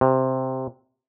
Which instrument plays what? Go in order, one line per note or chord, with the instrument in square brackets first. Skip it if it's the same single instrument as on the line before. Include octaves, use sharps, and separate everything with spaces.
[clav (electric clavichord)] C3